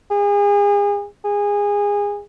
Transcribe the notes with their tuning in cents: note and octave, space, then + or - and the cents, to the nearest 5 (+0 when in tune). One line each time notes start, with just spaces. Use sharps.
G#4 -35
G#4 -25